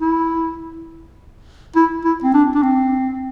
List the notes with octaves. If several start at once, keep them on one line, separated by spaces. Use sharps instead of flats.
E4
E4
E4
C4
D4
D4
C4